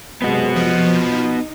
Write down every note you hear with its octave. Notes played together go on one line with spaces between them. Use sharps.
F#2 C3 G#3 B3 F#4
F3
D#4